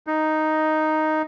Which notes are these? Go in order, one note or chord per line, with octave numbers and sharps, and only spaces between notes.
D#4